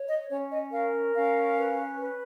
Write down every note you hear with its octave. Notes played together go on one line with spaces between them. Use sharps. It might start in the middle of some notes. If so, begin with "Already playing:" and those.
Already playing: C#5
D#5
C#4 C#5
D#5
A#4 F5
C#4 F5
B4
B4